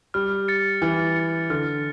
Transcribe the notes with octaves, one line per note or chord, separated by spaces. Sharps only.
G3 F6
A6 C#7
E3 F6
A6 C#7
D3 F6